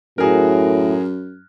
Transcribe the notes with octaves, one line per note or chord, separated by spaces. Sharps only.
F#2 A2 F#4 G#4 A#4